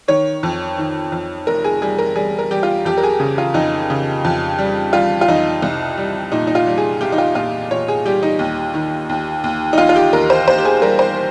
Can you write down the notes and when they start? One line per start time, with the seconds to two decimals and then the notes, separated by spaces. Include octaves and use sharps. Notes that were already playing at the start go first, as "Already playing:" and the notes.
0.08 D#3 C#5
0.43 F2
0.78 D#3
1.12 F2
1.47 F1 A#4
1.64 G#4
1.82 G3 G#4
1.99 A#4
2.16 G3 G#4
2.39 A#4
2.51 G3 G4
2.63 F4
2.85 F2 G4
2.98 A#4
3.03 G#4
3.20 C#3
3.38 F4
3.54 F2 D#4
3.90 C#3
4.24 F2
4.58 G3
4.93 G3 F4
5.21 F4
5.28 F2 D#4
5.62 C2
5.98 G3
6.32 A#2 D#4
6.47 D#4
6.55 F4
6.67 G3
6.77 G#4
7.01 C2 G4
7.12 D#4
7.18 F4
7.35 A#2 F4
7.71 A#2 C#5
7.88 G#4
8.05 G3 G4
8.23 D#4
8.39 D#2
8.74 D#3
9.09 D#2
9.44 D#2
9.73 D#4
9.78 D#2 F4
9.89 F4
9.96 G4
10.13 D#2 A#4
10.30 C5
10.48 D#2 C5
10.58 G4
10.65 G#4
10.82 G3 A#4
10.99 C5